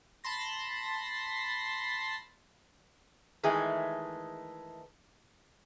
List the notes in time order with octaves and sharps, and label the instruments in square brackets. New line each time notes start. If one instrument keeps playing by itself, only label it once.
[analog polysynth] A5 B5 C6 A#6
[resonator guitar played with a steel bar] D#3 E3 G#3 A3 G#4